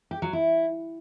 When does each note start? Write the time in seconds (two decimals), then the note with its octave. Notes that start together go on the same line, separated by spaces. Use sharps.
0.11 G4
0.22 F#3
0.33 E4